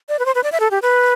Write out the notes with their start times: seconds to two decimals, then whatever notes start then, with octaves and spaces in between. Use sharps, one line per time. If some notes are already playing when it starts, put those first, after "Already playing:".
0.09 D5
0.19 B4
0.26 C5
0.35 B4
0.44 D5
0.52 E5
0.60 A4
0.71 G4
0.82 B4